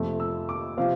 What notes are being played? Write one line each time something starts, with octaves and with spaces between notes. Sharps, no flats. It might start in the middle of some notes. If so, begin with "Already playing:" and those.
Already playing: F2 C3 F3 A3
E6
D6
C3 F3 C4 F5